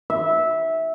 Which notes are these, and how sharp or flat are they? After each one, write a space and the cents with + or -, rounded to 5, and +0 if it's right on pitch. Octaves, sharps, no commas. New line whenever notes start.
E5 -15